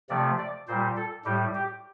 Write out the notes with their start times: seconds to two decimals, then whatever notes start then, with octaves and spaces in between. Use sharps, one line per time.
0.09 C3 F3 A3 D5
0.38 D5
0.68 A#2 G3 C5
0.96 A4
1.25 A2 G3 G4
1.55 G4